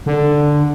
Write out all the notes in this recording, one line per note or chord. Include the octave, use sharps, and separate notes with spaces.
D3